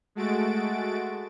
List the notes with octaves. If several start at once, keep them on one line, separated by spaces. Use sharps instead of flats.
G#3 A3 F#4 A6 D7